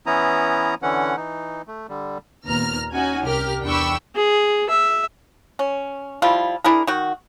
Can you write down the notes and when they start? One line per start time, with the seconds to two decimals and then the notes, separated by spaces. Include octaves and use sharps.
0.06 E3 B3 C#4 E4 A#5 D#6
0.82 D3 E3 C#4 F#5
1.17 E3 D#4
1.68 A3
1.89 D3 G3
2.46 D#2 A#2 B3 A#5 F6
2.93 C#4 D#4 F#4 G#5
3.25 C2 G4 A#4 F6
3.63 E2 D4 G5 B5 C#6 E6
4.15 G#4
4.70 E5
5.59 C#4
6.22 F3 G3 E4 F4
6.64 D4 E4 G#4 A#4
6.87 D#3 F#4